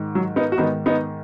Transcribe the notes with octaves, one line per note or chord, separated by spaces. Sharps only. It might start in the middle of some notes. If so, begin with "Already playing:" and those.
Already playing: G#2 D#3
F#3
B3 D#4
F#4
G#2 D#3 B3 D#4
B3 D#4